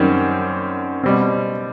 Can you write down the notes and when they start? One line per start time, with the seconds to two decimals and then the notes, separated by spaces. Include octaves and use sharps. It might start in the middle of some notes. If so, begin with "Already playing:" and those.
Already playing: F#2 D#3 G3 C4
1.03 B2 G3 C4